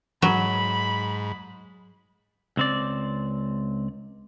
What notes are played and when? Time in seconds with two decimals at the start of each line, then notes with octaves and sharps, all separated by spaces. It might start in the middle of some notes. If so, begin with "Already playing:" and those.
0.22 G#2 F#3 B5
2.57 C#2 C4 D5